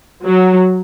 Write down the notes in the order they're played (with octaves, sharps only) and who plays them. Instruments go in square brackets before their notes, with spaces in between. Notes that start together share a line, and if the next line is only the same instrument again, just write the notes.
[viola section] F#3